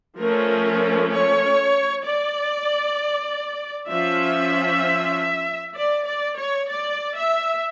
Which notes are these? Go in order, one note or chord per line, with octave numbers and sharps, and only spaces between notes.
F3 A3 C#4 A#4
C#5
D5
F3 C#4 E5
D5
D5
C#5
D5
E5